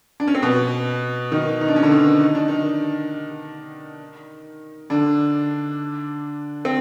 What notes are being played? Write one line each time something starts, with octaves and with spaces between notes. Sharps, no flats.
D4
C#4
C4
B2 B3
D#3 D#4
D#4
D4
C#4
D3 D4
D#3 D#4
D#4
D4
D#3 D#4
D3 D4
C4